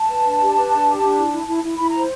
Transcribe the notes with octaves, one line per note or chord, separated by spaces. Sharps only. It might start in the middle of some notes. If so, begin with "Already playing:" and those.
Already playing: A5
B4
D4
G4
B4
D4
G4
D4
E4
E4
E4
E4
E4 B5
C5 A#5